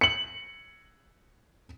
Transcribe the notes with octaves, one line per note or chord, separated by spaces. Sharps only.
C#7 F#7